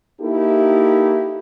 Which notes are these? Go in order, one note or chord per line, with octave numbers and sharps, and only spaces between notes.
A#3 D#4 E4 G4 A4